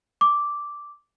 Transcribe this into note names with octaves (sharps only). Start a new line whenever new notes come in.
D6